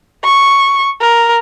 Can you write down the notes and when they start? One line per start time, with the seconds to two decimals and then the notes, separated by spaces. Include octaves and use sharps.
0.24 C#6
1.01 A#4